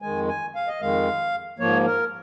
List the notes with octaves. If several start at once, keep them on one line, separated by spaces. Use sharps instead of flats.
F2 D#3 G#3 G#5
G#5
F5
D#5
F2 D#3 G#3 F5
G#2 F3 A#3 C#5
A#4